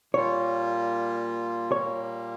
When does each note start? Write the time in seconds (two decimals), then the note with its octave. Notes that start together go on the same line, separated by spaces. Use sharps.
0.14 A#2 G3 A#3 F4 C#5
1.72 A#2 G3 A#3 C#5